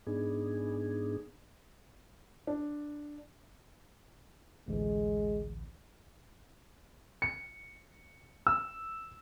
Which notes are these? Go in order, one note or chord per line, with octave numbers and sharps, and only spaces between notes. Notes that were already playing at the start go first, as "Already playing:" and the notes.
G#2 B3 D4 D#4 G#4
D4
A1 D2 G#3
C#7
E6